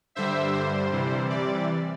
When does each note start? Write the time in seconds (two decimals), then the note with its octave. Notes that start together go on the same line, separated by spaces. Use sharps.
0.15 G2 D3 G3 C5 E5
0.54 C5
0.92 C3 E3 G3
1.30 D5